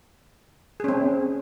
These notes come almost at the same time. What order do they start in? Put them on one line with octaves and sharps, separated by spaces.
G#4 C#4 C4